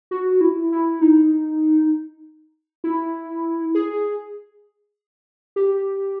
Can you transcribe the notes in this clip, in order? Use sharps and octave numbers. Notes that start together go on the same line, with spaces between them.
F#4
E4
E4
D#4
E4
G#4
G4